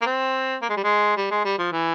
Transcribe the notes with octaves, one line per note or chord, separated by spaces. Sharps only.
A#3
C4
A#3
G#3
G3
G#3
G3
G#3
G3
F3
E3